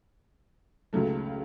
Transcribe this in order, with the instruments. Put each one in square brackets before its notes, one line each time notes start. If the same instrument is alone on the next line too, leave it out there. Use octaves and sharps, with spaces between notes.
[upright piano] C#2 C#3 F#3 A3